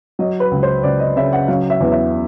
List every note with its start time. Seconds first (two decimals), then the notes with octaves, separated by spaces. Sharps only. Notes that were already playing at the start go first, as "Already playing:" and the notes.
0.19 F#3 D#5
0.40 B4
0.51 C#2
0.63 C5
0.83 C#2 D5
1.00 D#5
1.16 C#3 E5
1.33 F#5
1.48 F#3 F5
1.70 E5
1.80 E2
1.92 E5